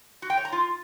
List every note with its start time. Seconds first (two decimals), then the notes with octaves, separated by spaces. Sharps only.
0.22 F#4
0.30 G5
0.37 C#5
0.45 A#5
0.52 F4